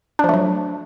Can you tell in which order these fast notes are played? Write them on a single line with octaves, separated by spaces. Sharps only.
D4 F3 A3 F#3